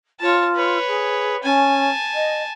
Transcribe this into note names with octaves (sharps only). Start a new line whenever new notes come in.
F4 C#5 A5
B4 C#5
G#4
C#4 G#5 A5
D#5